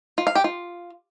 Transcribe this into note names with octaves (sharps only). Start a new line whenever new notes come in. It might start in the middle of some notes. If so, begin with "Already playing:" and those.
F4
F5
G4
F4